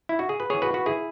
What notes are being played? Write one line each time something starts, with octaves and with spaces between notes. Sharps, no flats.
E4
F#4
G#4
B4
E3 B3 G#4 C#5
F#4 B4
F#4 B4
E4 G#4